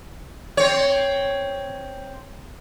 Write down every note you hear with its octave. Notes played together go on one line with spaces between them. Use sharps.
C4 C#5